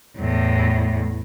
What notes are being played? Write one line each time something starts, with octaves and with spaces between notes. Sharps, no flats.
E2 A2